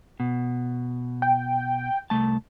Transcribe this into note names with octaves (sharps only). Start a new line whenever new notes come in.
B2
G5
C2 A3 A5